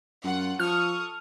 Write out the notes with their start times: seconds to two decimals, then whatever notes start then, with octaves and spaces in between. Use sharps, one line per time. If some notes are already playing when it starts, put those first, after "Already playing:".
0.24 F#2 F4 F#5
0.59 F3 A4 C#6 D#6 F6